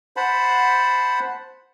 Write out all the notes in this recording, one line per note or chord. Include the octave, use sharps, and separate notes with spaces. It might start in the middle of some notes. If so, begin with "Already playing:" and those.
C5 F#5 A5 B5